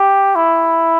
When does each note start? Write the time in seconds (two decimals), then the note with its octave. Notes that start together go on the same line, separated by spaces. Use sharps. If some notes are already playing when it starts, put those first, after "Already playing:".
Already playing: G4
0.36 E4